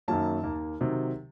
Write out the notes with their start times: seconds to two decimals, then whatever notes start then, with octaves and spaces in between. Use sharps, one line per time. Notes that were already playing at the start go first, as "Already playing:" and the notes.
0.08 F#2 D#3 F#3 A#3 C#4 A5
0.44 D#2 D#3 A#3
0.81 C3 D#3 F#3